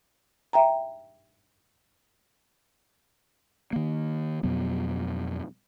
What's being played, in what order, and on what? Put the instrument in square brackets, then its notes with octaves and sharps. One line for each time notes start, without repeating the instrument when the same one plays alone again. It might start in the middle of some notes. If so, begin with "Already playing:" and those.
[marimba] E5 G5 A#5
[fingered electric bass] D#3 A#3
F2 B2 F#3 B3